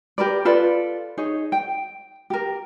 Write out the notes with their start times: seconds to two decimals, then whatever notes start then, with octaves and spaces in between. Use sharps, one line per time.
0.18 G4 A#4 B4 D5
0.45 F4 A4 B4 D5
1.18 D#4 G#4 C#5
1.52 G5
2.30 G4 A#4